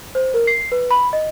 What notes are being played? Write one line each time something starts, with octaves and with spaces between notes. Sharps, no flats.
C5
A#4
C7
B4
B5
D#5